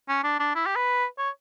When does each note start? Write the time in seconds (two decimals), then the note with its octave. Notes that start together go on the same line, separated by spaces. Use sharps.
0.09 C#4
0.24 D4
0.39 D4
0.55 E4
0.66 G4
0.76 B4
1.18 C#5